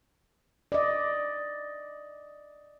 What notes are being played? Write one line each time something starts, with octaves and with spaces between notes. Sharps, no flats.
D5 D#5